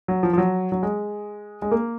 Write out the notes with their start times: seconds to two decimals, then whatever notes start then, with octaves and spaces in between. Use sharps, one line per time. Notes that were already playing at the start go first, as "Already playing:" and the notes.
0.08 F#3
0.23 F3
0.33 F3
0.38 F#3
0.72 F#3
0.83 G#3
1.62 G#3
1.71 A#3